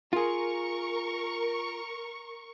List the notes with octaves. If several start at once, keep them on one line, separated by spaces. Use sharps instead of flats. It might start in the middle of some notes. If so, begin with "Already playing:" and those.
F4 G#4 A#4 C#6